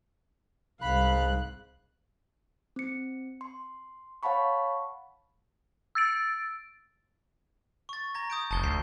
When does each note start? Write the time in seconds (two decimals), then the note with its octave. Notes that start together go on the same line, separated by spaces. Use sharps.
0.81 C2 G#2 F5 B5 F#6
2.76 C4 C#7
3.41 C6
4.23 C#5 F5 F#5 A5 B5 C#6
5.95 E6 A6 D7
7.89 C#6 A6
8.15 A#5 G#6 A#6
8.30 D#6 G6 D7
8.51 F1 A5 G6 G7
8.63 D2 C7